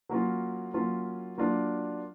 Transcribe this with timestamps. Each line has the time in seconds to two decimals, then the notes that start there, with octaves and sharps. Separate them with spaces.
0.09 F#3 A#3 C#4 F4
0.74 F#3 A#3 C#4 F4
1.38 F#3 A#3 D4 F4